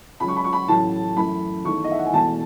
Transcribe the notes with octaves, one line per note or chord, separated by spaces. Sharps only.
C#2 C#3 F#3 B5
C#6
B5
C#6
B5
A1 A2 F#3 A3 A5
F#2 E3 A3 B5
E2 D#3 A3 C#6
D#5
E5
F#5
G#5
E1 E2 B2 A3 A5